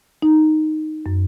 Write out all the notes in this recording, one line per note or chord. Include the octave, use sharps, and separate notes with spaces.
D#4
F#2